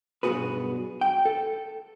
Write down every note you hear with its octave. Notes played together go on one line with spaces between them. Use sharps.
B1 G2 B3 F#4 G#4 B4
G5
A4